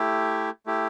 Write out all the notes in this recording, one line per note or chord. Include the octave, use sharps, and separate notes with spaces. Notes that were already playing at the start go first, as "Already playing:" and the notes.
Already playing: A3 E4 G4
A3 E4 G4